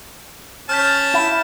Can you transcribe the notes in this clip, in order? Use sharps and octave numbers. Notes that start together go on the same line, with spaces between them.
C#4 A5 F6 G6 B6
E4